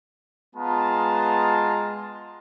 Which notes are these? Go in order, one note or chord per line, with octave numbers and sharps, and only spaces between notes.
G#3 B3 F4 A5 A#5